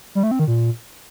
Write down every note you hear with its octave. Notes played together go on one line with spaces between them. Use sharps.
G3
A3
C4
D#3
A#2